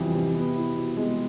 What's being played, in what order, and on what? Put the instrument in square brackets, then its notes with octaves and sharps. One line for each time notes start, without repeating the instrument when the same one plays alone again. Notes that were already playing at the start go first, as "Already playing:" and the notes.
Already playing: [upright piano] F2 C3 E3 G3
C3
B3
E4
B2
G#3